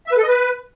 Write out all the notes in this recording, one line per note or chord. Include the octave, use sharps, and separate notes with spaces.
E5
B4
A4
D#5
B4